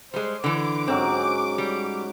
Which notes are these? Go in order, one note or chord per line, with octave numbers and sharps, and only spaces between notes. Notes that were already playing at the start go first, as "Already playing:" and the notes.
G3 G#3 C5
D3 E3 D6
G#2 F#3 C4 C#4
G3